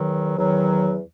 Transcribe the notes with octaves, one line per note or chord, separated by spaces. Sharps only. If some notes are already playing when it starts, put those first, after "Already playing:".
Already playing: E2 D#3 F#3
E2 D#3 F#3